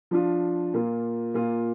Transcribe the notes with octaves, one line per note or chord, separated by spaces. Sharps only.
F3 D4 F4
A#2 A#3 F4
A#2 A#3 F4